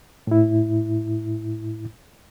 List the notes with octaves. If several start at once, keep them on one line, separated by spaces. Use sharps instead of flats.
A2 E4